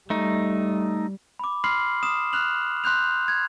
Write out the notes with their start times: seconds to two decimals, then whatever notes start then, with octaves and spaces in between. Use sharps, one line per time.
0.10 G3 A3 D#4
1.39 B5 D6
1.64 B5 C6 F6 C7 F#7
2.03 D#6 E7
2.33 F6 F#6 F7 F#7
2.84 C6 F#6 G6 F7
3.28 G#6